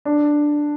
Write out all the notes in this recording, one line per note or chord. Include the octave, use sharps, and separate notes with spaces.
D4